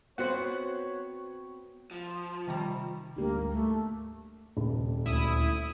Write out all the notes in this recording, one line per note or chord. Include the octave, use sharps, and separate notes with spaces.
B3 C4 F#4 C5 C#5 F#5
F3
C3 D#3 G3
D2 G#2 G3 A#3
A3
D#1
D2 E4 D#6